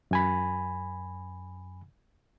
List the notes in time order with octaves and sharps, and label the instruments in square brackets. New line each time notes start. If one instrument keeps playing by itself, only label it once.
[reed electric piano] F#2 G#5 B5